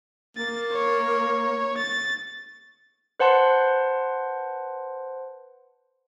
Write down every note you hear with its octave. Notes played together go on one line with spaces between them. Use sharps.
A#3 A6
C#5
A6
B4 C5 F#5 A5 C6